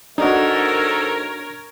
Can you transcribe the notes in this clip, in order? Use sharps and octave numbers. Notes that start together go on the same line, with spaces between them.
G#2 D#3 D4 D#4 F#4 A4 A#4 C#5